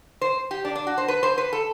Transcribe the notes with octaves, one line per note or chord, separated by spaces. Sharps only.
C5
G4
D4
D4
F#4
C5
B4
C5
B4
A4